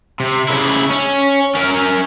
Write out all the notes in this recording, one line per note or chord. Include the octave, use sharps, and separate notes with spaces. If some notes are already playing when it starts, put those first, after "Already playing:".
C3
C#3 E4
C#4
C#4 A#4